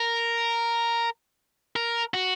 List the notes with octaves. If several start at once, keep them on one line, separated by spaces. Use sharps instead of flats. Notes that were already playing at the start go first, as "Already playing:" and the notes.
Already playing: A#4
A#4
F#4